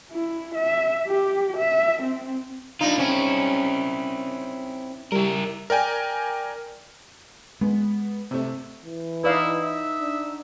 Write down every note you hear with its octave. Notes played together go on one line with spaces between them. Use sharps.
E4
E5
G4
E5
C4
D4 D#4 F4
C4 C#4 E4
G3 E4 A#4
A#4 D5 G5 G#5
G#3 B3
C3 A3
E3
D#4 E4 F#4 B4 D5 F5
E5
D4